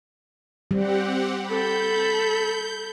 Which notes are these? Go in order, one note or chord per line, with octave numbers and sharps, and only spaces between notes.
G3 C4 G4 F#5
A4 B5 G6